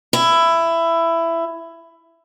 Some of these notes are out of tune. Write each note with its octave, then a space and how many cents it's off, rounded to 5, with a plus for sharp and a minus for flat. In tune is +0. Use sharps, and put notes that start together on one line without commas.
E4 +15